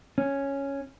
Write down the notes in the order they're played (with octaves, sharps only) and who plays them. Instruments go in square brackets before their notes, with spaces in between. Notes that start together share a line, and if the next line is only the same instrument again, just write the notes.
[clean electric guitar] C#4